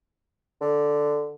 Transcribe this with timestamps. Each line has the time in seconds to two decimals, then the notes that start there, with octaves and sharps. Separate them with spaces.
0.61 D3